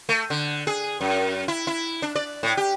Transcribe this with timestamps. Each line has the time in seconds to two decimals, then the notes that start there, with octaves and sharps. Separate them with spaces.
0.09 A3
0.30 D3
0.67 G#4
1.01 F#2
1.48 E4
1.67 E4
2.02 D4
2.15 D5
2.43 A2
2.57 G4